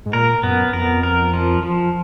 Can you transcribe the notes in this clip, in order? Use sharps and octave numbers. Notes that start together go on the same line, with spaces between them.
G#2
A#2 A#4
F#2 B3
F2 A#4
A#4
F3
F3